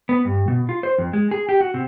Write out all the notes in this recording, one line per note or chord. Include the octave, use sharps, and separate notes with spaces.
B3
G2
B2
F4
C5
F2
G#3
G#4
G4
F#4
C3